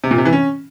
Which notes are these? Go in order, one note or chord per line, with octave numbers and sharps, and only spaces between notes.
C3
A#2
C3
E3
C#4